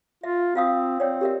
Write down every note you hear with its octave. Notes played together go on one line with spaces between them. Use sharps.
F4 E5
C4 F4 F5 D#6
C4 C#5 D5 G5
G4 A#4 E5